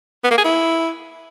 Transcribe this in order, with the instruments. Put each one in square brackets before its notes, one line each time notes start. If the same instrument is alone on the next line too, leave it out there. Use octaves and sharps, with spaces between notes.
[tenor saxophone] B3
A#3
G#4
E4